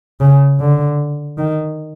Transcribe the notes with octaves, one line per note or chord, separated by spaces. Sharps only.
C#3
D3
D#3